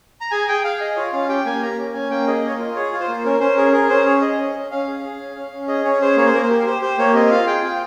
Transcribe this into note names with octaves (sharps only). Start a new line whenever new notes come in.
A#5
G#4 G#5
G#4 G5
G#4 F5
G#4 D#5
F4 C#5
C#4 F5
G4 G5
A#3 G#5
A#3 A#5
C#4
C#4 G#5
A#3 G5
G#4 D#5
A#3 C#5
D#5
F4
G#4 C#5
F4
C5
A#3
C#4 A#4
C#4 C5
G#4 A#4
G#4 A#4
C#4 C5
G#4 C#5
G#4 D#5
C#4
C#4
C#4 F5
G#4
G#4
C#4
C#4
C#4
G#4 D#5
C#4 C#5
G#4 C5
A#3 C#5
C5
A#3 A#4
C5
G4
A#4
G4 C5
G4 C5
A#3 C#5
C4 D#5
F4 F5
G#4 G5
F4 G5